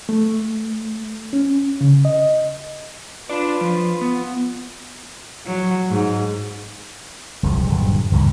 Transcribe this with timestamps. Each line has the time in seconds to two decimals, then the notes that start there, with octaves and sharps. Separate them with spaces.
0.09 A3
1.33 C#4
1.81 C#3
2.05 D#5
3.30 D4 F4 B4 D5
3.61 F3
4.01 B3
5.46 F#3
5.89 G#2
7.43 E1 C2 F2 F3
7.67 D#1 G2 D3 F#3
8.12 C#2 G2 A#2 D#3